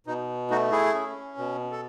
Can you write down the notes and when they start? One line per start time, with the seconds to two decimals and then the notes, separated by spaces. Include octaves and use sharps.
0.07 B2 D#4
0.50 A3 D#4 F#4
0.72 E4 G#4
0.94 C#4
1.38 B2
1.71 A4